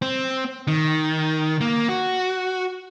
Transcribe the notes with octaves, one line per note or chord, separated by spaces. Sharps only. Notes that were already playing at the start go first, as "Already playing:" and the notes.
C4
D#3
A#3
F#4